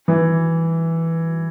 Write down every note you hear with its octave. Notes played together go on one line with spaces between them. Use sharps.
E3